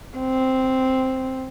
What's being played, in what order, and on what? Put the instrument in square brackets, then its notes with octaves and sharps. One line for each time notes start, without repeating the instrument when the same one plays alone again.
[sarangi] C4